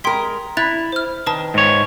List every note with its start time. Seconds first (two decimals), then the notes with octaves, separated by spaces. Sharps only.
0.04 G#3 A#4 G5 C6 B6
0.57 E4 F#6 A6 F7
0.92 C5 F6
1.26 D#3 B4 A5
1.54 G#2 C#5